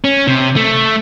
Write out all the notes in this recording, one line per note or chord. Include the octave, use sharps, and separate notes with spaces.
C#4
C3
A3